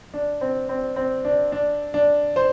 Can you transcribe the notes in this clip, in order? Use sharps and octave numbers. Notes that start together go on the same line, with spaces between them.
D4
C4
C4
C4
D4
D4
D4
C5